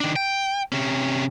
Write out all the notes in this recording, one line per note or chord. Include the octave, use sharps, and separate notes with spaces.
D#3 D4
G5
C3 C#4